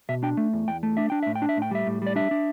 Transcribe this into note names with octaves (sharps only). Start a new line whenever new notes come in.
B2 E5
D4 G5
A3
E2
E2 G5
A3
D4 E5
D4 G5
A2 E5
G5
D4
E5
A2 G5
G3 E5
A2
G3 D5
D4 E5
D4